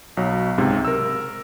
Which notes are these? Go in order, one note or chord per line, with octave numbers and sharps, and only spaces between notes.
B1 F#3
C#2 G#2 C3
A#4 E6